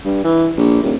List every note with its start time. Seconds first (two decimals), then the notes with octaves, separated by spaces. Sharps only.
0.05 G2
0.24 E3
0.57 A#1
0.83 D#1